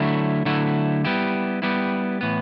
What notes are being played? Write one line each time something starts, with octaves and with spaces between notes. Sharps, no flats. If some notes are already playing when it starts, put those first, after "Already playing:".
Already playing: D3 F#3 A3 E4
D3 F#3 A3 E4
G3 B3 E4 G4
G3 B3 E4 G4
A2 E3 B3